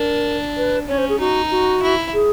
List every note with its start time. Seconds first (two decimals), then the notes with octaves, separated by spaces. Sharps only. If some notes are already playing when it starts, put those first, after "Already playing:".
Already playing: D4 A#4
0.57 B4
0.88 C#4 C#5
0.98 C5
1.09 G#4
1.20 D#4 F#4
1.51 F#4
1.82 E4
2.14 G#4